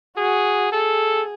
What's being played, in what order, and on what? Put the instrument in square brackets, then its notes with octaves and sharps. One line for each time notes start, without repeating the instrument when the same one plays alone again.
[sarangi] F#4 [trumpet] G#4
[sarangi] G#4 [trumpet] A4